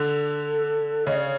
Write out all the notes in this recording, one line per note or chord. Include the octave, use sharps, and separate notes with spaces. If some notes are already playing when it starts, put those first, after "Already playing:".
Already playing: D3 A4
C#3 D#5
D5